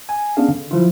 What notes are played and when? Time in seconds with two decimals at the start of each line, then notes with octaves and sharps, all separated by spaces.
0.09 G#5
0.37 B3 C#4 D4 G#4 F5
0.48 D3
0.71 F3 F#3 E4 F4